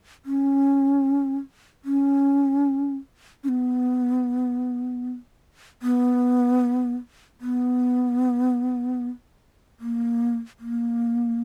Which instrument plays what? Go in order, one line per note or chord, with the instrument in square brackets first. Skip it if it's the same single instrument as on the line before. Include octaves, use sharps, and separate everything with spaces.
[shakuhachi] C#4
C#4
C#4
B3
B3
B3
A#3
A#3